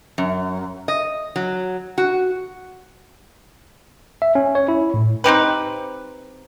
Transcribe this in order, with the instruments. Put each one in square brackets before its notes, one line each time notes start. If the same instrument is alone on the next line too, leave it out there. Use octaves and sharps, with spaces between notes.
[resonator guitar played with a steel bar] F#2
D#5
F#3
F#4
[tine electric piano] E5
C#4
C#5
E4
A2
[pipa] C4 D#4 G4 B4